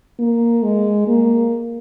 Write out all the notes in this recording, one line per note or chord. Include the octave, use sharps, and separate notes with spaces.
A#3
G#3
A#3